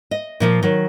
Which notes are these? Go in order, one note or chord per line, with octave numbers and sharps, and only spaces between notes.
D#5
A#2 F3 F4
D#3 F#3